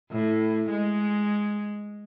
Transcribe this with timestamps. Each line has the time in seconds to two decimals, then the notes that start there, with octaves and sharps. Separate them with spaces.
0.12 A2
0.70 G#3